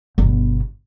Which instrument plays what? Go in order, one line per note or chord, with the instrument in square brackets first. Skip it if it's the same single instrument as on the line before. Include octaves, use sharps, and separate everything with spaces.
[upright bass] G1 B2